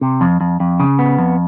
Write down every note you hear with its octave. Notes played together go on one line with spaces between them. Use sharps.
C3
F2
F2
F2
C#3
B3
F2